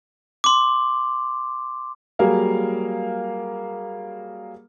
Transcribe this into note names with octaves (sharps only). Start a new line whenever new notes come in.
C6 D6
F#3 G3 A#3 G#4 A#4 F5